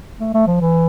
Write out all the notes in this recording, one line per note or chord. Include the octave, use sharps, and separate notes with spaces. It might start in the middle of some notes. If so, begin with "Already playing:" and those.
A3
A3
F3
E3